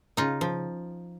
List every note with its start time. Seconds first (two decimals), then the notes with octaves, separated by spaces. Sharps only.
0.17 C#3 D#4 F4
0.41 F3